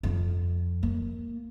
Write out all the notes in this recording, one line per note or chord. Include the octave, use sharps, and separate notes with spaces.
F2
A#3